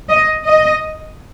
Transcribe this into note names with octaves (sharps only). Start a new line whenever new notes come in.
D#5
D#5